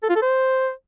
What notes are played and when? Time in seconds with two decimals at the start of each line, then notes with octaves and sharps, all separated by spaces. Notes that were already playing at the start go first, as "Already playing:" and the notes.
0.03 A4
0.09 F4
0.16 A4
0.22 C5